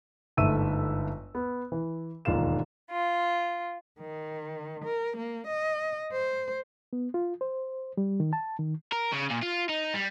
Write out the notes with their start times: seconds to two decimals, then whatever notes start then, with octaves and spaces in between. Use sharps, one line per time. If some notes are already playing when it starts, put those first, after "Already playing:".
0.37 G1 G#2 A3 E5 E6 D#7
1.35 B3
1.72 E3
2.25 E1 D#2 G#2 F4 F5 E7
2.91 F4
3.99 D#3
4.84 A#4
5.17 A#3
5.47 D#5
6.12 C5
6.93 B3
7.14 F4
7.41 C5
7.97 G3
8.20 D#3
8.33 A5
8.59 D#3
8.92 A#4
9.12 C#3
9.30 A#2
9.42 F4
9.69 D#4
9.94 G3